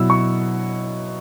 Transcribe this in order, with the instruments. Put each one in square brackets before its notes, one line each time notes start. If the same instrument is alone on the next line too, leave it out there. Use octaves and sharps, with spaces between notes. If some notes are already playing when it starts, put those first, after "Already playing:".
Already playing: [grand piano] B2 F#3 E4 E6
C#6